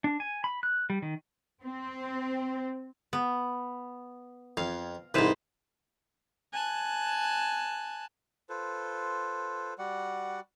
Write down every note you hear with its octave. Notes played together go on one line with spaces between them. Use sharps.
D4
G#5
B5
F#6
G3
D#3
C4
B3
F2 F5
C2 G#2 B4 C5 F5
G#5 A5 F#6
F4 A4 B4 C5
G3 F#4 D5 F#5